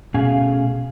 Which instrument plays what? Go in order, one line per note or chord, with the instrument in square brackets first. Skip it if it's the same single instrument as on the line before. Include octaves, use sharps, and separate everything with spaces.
[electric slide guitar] B2 A3 C#4 G#4 F5 G#5